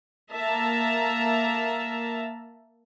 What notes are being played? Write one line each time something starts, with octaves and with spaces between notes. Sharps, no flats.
A#3 E5 A5 A#5